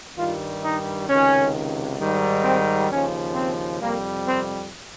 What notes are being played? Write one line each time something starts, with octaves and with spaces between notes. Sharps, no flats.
G2 D#3 G3 F4
D#4
C#2 C3 D#3 C#4
G#2 D#3 G3
C4
D#2 C#3 F3 C#4
C4
F2 C3 G3 A#3
C4